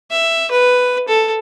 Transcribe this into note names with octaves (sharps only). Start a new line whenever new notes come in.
E5
B4
A4